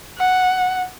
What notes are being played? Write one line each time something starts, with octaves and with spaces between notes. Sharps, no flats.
F#5